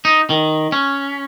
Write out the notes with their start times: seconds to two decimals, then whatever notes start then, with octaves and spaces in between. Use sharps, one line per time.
0.05 D#4
0.30 D#3
0.72 C#4